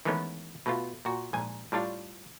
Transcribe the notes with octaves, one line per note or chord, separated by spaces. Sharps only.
D#3 E3 G#3 A3 B3 C#4
B2 A3 B3 F4
A#2 F#4
A#1 G#2 G#5
A2 G3 D4 F4 C#5